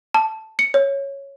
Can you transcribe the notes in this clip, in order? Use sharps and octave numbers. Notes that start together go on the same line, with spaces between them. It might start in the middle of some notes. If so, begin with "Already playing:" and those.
A5
C#7
C#5